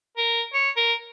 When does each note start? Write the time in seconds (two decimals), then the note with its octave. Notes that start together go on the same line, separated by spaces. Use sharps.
0.17 A#4
0.54 C#5
0.77 A#4